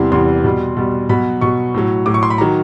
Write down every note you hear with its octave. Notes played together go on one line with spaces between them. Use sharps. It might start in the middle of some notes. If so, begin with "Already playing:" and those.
Already playing: E2 C3 E3 G3 C6
E2 C3 E3 G3 C6
B2 G3
B2 G3
B2 F#3 B5
B2 F#3 C#6
A2 F#3
A2 F#3 D6
C#6
C6
B5
D#3 F#3 A#5